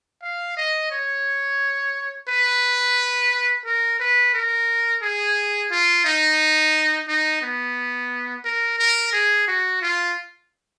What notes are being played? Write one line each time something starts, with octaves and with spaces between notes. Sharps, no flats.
F5
D#5
C#5
B4
A#4
B4
A#4
G#4
F4
D#4
D#4
B3
A#4
A#4
G#4
F#4
F4